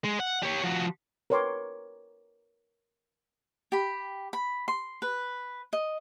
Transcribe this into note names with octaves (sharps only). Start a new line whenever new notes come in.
G#3
F#5
G4 C#5
F3 F#4
A#4 B4 C#5 G5 C6 D6
G4 B5
B5
C6
B4
D#5